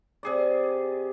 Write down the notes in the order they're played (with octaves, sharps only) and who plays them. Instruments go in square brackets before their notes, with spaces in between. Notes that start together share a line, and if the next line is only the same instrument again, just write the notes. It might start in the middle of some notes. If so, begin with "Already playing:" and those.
[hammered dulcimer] C3 G#4 D5